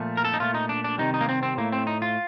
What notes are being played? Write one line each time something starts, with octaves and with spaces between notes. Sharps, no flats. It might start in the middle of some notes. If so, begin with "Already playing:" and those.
Already playing: A#2 F3 A3
A#4
A4
D#4
A#2 A3 F4
D#4
D4
D4
C3 D#3 G3 D#4
D#4
A#3
C4
C4
A2 A3 A#3
C4
D#4
F4